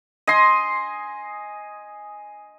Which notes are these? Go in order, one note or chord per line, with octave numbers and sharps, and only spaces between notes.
D#5 G#5 C6